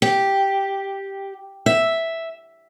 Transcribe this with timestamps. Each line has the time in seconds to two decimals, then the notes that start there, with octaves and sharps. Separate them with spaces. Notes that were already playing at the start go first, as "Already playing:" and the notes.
0.02 G4
1.66 E5